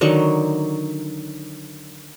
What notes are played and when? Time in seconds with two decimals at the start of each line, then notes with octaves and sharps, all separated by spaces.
0.01 D3 D#3 F#3 C#6